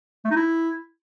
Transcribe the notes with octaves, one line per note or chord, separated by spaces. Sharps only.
A3
D#4
E4